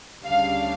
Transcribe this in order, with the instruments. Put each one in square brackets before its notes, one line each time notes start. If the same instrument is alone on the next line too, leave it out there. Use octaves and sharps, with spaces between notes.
[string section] D2 C#3 G3 D4 F5